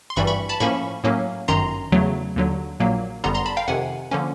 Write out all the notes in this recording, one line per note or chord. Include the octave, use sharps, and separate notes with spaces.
C6
G#1 G2 E3 G3 B5 C#6
B5 C#6
A5 B5
A2 F3 A#3 C#4 B5 C#6
A2 F#3 A#3 C#4
G1 F#2 D#3 A#5 C6
E2 C#3 F#3 A3
D#2 D3 F#3
A#1 A#2 F#3 A#3
G1 F#2 D3 G3 B3 A#5 C6
A#5 C6
A5 B5
F5 G5
F2 C3 D#3 F#5 G#5
D3 F3 A#3 C#4